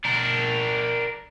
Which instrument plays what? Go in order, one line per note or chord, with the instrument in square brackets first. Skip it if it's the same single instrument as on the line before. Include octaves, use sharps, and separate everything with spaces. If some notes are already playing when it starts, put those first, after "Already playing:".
[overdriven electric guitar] D4 A#4